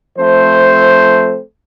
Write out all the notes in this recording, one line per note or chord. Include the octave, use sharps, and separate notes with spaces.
F3 A3 C4 A4 C5